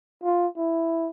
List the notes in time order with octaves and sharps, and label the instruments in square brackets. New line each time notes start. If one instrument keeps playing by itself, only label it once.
[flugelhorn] F4
E4